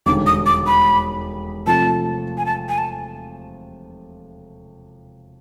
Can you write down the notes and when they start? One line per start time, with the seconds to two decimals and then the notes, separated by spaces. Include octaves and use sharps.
0.06 E1 D#2 D3 G3 D6
0.27 D#6
0.46 D6
0.67 B5
1.66 C3 F3 A3 A5
2.38 G#5
2.46 A5
2.69 G#5
2.78 A5